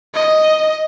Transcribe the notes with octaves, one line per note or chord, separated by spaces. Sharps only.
D#5